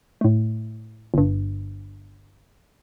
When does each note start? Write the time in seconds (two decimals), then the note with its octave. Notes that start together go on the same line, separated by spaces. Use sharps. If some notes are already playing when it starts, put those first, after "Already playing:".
0.21 A2 A3
1.14 G1 G2